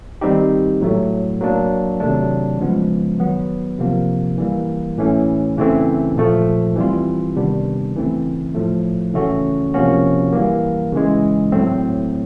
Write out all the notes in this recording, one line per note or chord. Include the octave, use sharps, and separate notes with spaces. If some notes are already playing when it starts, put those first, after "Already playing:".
D#3 G3 C4 D#4 G4
A2 F#3 A3
F#3 A#3 D4
C3 D#3 F#3 A3 D4
C#3 F3 G#3 B3
D#3 F#3 B3
C3 F3 A#3
E3 G3 A#3
A2 E3 A3 C#4
C#3 E3 A3 C4
A#2 F3 A3
E3 G3 C4 F4
C3 D#3 G3 B3 D4
C#3 E3 A3 C4
A2 F3 A3
C#3 E3 A3 C#4 F#4
C3 F3 A#3 C#4 F#4
E3 G3 A#3
C#3 E3 G#3
A2 F#3 A3 C4